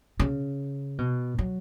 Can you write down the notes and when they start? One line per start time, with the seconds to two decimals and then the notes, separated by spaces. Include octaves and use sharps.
0.20 C#3
0.98 B2
1.39 F#3